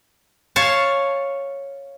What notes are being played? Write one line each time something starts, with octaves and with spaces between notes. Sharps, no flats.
C#5 F5 A5